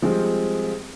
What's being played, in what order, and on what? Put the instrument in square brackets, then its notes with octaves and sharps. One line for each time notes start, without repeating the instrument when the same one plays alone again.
[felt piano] F3 G3 G#3 C4 F4 G4